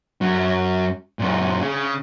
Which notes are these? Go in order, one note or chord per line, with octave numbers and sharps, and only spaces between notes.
F#2 F#3
F#2 A#2
C#3